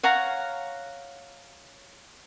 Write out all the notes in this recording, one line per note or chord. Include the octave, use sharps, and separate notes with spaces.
C#5 F5 F#5 A#5